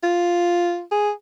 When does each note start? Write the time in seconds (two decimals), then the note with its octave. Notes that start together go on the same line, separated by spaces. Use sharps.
0.04 F4
0.92 G#4